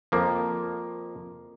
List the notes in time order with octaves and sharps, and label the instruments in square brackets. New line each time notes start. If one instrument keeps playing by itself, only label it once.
[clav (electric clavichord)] F2 F3 A#3